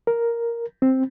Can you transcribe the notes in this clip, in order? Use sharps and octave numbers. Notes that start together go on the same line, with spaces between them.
A#4
C4